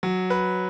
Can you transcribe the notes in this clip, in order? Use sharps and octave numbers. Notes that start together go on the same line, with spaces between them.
F#3
B4